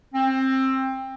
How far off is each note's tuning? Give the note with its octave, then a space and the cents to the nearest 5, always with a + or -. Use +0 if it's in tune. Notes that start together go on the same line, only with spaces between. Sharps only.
C4 +20